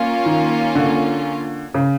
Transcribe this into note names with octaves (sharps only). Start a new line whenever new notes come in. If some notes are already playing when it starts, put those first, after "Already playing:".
Already playing: A#3 C#4 F4
D#3
D3
C#3